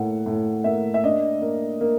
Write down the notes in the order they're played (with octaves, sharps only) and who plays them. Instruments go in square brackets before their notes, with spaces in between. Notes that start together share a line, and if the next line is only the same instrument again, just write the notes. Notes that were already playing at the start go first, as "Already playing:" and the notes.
Already playing: [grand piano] A2 A#3 F#5
A2
A#3 E5
E5
D4 D#5
A#3
A#3